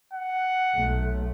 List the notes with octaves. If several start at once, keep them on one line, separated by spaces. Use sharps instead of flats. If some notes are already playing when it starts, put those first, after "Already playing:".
F#5
B1 A3